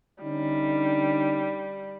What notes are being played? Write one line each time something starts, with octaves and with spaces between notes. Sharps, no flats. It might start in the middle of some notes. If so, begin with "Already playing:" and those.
D3 G3 C#4 D#4